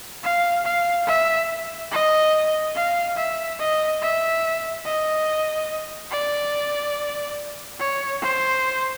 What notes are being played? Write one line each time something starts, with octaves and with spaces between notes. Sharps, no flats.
F5
F5
E5
D#5
F5
E5
D#5
E5
D#5
D5
C#5
C5